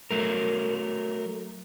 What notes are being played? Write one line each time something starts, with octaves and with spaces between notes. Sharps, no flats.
F#3 A3 A#4